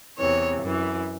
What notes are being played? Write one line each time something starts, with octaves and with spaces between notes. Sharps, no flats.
E2 C3 E3 C#5
F#2 E3